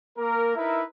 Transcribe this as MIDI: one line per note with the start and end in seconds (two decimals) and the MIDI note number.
0.17 0.52 58
0.17 0.52 70
0.56 0.81 63
0.56 0.81 64
0.56 0.81 70
0.56 0.81 71
0.56 0.81 76